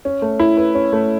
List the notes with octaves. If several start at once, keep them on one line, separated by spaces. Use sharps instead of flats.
C#4
A3
E4
B4
C#4
A3